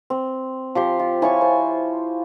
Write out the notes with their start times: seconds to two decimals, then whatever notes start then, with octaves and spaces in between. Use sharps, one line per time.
0.10 C4
0.75 F3 G4 C6
0.99 F4
1.22 E4 F4 C#5 G#5 C#6
1.41 C5